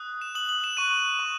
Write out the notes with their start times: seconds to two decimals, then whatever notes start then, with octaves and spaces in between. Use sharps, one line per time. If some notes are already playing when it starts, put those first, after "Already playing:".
Already playing: D#6 F#6
0.21 E7
0.35 D#6 F#6 F#7
0.49 F#7
0.64 E7
0.77 C#6 F#6 D#7
1.19 C#6